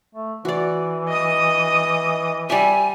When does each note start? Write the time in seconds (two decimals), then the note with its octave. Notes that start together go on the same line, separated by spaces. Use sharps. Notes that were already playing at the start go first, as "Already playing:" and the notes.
0.15 A3
0.45 E3 F#4 D5
1.08 D#5 D#6
2.50 G3 G4 E5 G#5